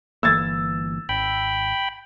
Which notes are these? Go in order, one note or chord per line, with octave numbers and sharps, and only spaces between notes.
G1 E3 A#3 E6 G#6 A6
G#1 G5 B5